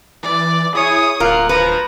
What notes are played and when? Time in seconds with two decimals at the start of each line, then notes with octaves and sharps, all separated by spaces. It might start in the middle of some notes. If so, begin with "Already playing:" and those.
0.23 E3 D5
0.74 E4 G#4 C#5 D#6
1.20 D1 A#3 F4 A#4 F#5
1.49 F3 B4 A#5